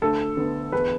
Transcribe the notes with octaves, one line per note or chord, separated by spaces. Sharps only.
D2 A4
D3 B3
E2 B4